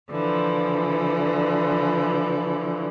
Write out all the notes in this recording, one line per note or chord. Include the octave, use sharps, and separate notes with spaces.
D3 E3 F3